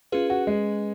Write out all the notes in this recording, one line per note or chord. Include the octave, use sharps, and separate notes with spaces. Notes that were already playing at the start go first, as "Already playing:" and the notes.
C#4 F4 G#4 B4
F#4
G#3